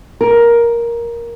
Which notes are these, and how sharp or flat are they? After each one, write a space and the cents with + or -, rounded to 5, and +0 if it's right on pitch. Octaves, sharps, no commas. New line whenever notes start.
A#4 +10